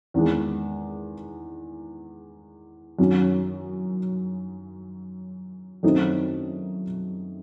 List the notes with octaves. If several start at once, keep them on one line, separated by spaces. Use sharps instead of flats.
E2 D#3 G#3
F#2 D#3 F#3 C#4
F#2 D#3 A3 C4 D#4